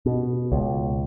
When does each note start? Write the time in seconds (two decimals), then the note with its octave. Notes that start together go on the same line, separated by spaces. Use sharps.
0.06 B2
0.52 C#2